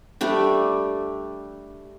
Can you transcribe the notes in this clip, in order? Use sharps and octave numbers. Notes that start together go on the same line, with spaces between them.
G3 A3 D4